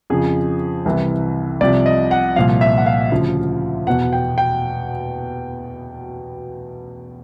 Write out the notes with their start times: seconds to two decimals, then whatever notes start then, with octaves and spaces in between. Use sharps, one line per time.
0.10 F2 C#3 F3 G#4
0.85 C2 C3 E3
1.61 C2 C3 F3 D5
1.86 D#5
2.11 F#5
2.36 C2 A#2 F3 F5
2.61 E5
2.77 F#5
2.86 F5
3.11 D2 C#3 F3
3.87 E2 F#5
3.90 B2
4.13 G5
4.38 G5